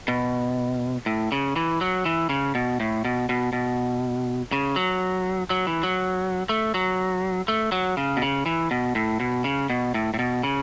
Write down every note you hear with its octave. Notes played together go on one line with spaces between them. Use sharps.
B2
A2
C#3
E3
F#3
E3
C#3
B2
A2
B2
B2
B2
C#3
F#3
F#3
E3
F#3
A3
F#3
A3
F#3
C#3
B2
C#3
E3
B2
A2
B2
C#3
B2
A2
A2
B2
C#3